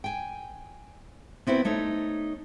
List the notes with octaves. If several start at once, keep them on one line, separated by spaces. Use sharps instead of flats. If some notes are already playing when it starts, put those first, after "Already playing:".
G5 G#5
B3 C4 E4 F#4 B4
A3 D#4 C#5 E5